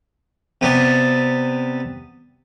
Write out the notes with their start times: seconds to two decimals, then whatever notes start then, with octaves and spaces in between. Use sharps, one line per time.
0.61 C3 B3 D5 A5